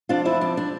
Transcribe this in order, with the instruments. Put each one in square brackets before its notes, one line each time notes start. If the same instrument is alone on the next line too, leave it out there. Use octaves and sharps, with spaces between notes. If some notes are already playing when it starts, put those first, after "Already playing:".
[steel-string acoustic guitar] F2 D4 F4
F3 E4
F2 D4
D4